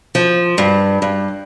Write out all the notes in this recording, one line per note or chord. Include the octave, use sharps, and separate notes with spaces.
F3
G2
G2